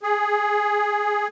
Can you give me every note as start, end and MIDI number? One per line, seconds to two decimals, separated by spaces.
0.03 1.28 68